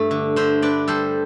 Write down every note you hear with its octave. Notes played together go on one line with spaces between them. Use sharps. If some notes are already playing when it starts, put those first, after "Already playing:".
Already playing: G2 A3 E5
D3
D3 C5 E5
D4 B4 D5
G3 A4 C5